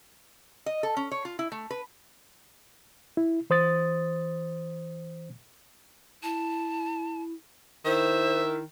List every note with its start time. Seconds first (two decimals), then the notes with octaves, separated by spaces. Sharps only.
0.66 D#5
0.83 A4
0.97 C#4
1.11 C#5
1.25 F4
1.39 E4
1.52 A3
1.71 B4
3.17 E4
3.50 E3 C5 D#6 A6
6.23 E4 A5
7.85 D#3 E4 C5 E5